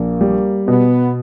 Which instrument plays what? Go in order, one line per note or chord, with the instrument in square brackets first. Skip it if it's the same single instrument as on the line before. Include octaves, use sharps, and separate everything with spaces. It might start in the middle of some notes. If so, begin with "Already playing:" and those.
Already playing: [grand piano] A#1 [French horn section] A#3
[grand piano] G3
[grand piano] B2 [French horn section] B3